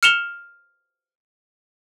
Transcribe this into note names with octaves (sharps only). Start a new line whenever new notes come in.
F6 C#7 E7 F7 G7